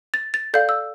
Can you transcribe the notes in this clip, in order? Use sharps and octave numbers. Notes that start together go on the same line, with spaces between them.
A6
A6
A4 D5 F5 G6
E6